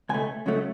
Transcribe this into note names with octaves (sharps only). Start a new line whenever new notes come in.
C#2 B2 A3 G#5
C#2 C#3 F#3 A3